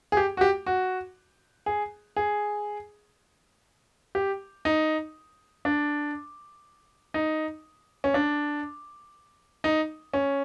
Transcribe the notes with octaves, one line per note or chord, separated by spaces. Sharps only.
G#4
G4
F#4
G4
F#4
G#4
G#4
G4
D#4
D4
D#4
C#4
D4
D#4
C#4